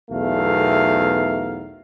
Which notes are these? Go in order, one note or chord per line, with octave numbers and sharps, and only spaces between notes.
B1 E2 A3 A#4 F5